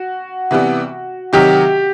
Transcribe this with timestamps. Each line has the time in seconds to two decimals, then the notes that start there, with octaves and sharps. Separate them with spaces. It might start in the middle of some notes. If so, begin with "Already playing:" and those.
Already playing: F#4
0.51 C3 E3 G3 B3
1.33 C3 D#3 F#3 G4